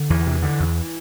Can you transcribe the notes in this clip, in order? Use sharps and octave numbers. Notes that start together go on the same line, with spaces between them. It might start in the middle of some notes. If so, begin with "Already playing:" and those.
Already playing: D3
E2 E3
C3
D3
E2